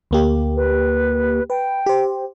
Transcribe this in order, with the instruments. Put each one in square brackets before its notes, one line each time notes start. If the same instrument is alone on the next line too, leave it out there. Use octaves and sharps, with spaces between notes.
[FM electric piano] D2 A#3 G4
[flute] B4
[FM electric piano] B4 [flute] G5
[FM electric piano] G4 C5